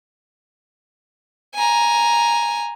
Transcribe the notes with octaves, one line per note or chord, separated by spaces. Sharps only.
G#5 A#5